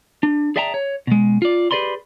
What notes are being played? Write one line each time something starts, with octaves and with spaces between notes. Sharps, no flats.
D4
G#4 D5 E5 G5 A5 A#5
C#5
B2 G#3
F4 D5
G4 G#4 B4 D5 B5 C6